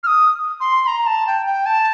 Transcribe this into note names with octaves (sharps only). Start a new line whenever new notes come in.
F6
D#6
C6
A#5
A5
G5
G5
A5